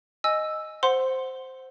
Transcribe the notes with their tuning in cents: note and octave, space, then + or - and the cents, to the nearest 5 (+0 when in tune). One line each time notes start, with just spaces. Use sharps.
D#5 +0 G#5 +0 E6 +0
C5 +0 F#5 +0 C6 +0